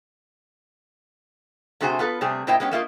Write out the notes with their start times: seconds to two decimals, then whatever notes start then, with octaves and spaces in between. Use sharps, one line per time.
1.81 C3 A3 F#4 G#4 C5 G#5
1.99 B3 F4 A4 B4
2.21 C3 G3 A3 C4 G#4
2.47 A#2 A#3 E4 C5 D#5 G5
2.60 G#3 B3 C#4 G4
2.71 A3 A#3 F4 D#5